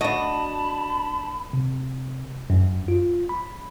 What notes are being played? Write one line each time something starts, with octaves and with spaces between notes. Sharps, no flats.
D4 F#4 D#5 A5 B5
C3
F#2
F4
B5